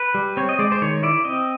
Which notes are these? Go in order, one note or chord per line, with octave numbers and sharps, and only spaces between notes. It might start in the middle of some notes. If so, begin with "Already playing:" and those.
Already playing: B4
G3
C4 C#5
D#5
G#3 D5
C5
D#3 C#5
E4 D5
C4 D#5